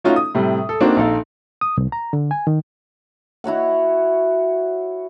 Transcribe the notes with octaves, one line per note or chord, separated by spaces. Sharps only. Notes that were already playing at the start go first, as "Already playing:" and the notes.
A3 C#4 D#4 F4 F#4
D#6
A2 C3 G3
A4
A#3 C4 D4 D#4 F#4
A#1 D#4 A4 F5
D#6
C2
A#5
D3
G#5
D#3
E4 F#4 C#5 F#5